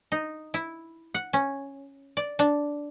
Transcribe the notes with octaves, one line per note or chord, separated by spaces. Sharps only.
D#4
E4
F#5
C#4
D5
D4